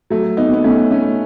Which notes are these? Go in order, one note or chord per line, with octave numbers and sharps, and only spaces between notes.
F#3 A3
B3 D#4
B3
A3 C#4
A3 C#4